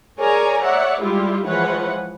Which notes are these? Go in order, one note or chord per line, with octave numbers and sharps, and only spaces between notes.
G#4 A#4 C#5 D5 G#5 A#5
C#5 D5 E5 F#5
G3 G#3 E4 F4 G4
E3 F3 G#3 B4 C#5 F#5